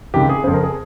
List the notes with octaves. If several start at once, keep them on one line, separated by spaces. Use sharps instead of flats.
C#2 C3 D#3 G4
G#4
F2 C#3 C5
A#4
G#4